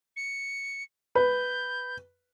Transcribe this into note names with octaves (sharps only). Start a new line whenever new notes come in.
C#7
B4 G6